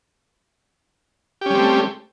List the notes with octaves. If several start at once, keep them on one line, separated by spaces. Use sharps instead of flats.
G3 A3 C4 C#4 G4